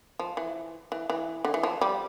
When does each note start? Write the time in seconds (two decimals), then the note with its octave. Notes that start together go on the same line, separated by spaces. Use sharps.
0.19 F3
0.37 E3
0.92 E3
1.10 E3
1.45 D3
1.54 E3
1.63 F3
1.81 G3